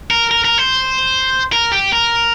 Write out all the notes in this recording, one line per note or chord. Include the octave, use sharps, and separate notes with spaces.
A#4
A#4
A#4
C5
A#4
G4
A#4